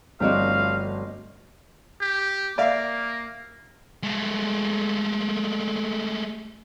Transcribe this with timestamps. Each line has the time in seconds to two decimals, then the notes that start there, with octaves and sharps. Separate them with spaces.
0.20 G1 F3 A3 C4 F#4 D5 D#5 F5
2.01 G4
2.58 A#3 D5 E5 F5
4.03 G#3 A3